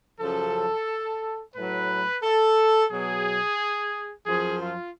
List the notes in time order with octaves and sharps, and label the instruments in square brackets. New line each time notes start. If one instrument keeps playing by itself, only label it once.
[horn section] F#2 C#3 F3 A4
A2 F#3 B4
A4
B2 F#3 G#4
F#2 F3 G#4
F4